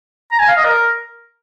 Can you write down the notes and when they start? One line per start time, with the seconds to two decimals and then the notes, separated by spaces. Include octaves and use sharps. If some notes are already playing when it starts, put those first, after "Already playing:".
0.32 A#5
0.39 G#5
0.48 F5
0.57 D#5
0.65 A#4